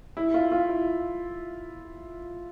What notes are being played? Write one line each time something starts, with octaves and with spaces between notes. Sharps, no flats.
E4
F4
F4
E4